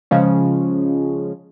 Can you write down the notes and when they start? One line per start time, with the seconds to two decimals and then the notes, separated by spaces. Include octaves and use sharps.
0.11 C#3 F3 G#3 C#4